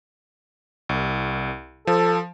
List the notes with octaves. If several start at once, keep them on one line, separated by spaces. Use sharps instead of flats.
C2
F3 A4